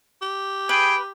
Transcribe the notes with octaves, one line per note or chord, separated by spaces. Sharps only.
G4
G#4 B4 G5